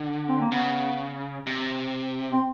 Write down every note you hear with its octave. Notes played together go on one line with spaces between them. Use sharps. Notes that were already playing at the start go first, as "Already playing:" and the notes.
Already playing: D3
C4
A#3
C#3 B3
C3
C4